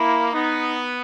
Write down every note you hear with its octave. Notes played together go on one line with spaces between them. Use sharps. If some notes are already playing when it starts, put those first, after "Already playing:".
Already playing: A#3 E4
B3 D#4